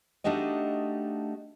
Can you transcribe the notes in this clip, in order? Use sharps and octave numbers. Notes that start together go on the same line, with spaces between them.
A3 D4 D#4 F#4 G4 D#5